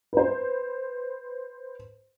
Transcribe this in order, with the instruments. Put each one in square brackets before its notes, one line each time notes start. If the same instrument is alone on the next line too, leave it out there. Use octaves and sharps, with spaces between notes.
[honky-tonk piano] B4 C5